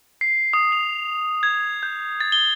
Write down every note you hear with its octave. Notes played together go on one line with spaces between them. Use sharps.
C7
D#6
F7
G#6
G6
A6
G7